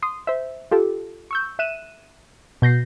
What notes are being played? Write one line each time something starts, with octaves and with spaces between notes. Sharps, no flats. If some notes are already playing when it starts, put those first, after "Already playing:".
C6 D#6
C5 E5
F4 G4 A4
C#6 E6 G6
E5 F#6 D#7 E7
B2 G6 A#6 C7